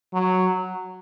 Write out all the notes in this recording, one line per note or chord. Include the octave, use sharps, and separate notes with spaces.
F#3